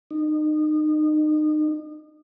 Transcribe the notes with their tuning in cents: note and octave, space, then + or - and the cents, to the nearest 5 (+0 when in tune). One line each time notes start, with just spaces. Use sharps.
D#4 -30